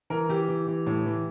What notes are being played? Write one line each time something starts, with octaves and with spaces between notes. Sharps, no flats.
E3 A#4
E3 G4
E3
E3
A2
E3